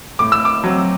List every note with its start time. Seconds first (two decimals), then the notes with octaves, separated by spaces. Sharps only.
0.19 A2 D6
0.32 E6
0.45 D6
0.64 F#3 C4